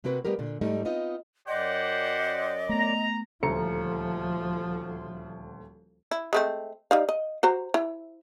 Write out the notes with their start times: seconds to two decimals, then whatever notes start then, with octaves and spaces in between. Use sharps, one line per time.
0.04 C3 A#3 C4 F#4 B4
0.25 G3 A#3 B3 G4 A#4
0.39 A#2 D3
0.61 G#2 G3 A3 D#4
0.85 B3 C4 D#4 F4 D#5
1.48 F#2 G4 C5 D5 D#5 F#5
2.69 A3 B3 A#5
3.43 D#1 D2 F3 A4 A#5 C#7
6.11 E4
6.33 G#3 A3 C4
6.91 G3 D#4 F5
7.09 D#5
7.43 F#4 C5 A#5
7.74 E4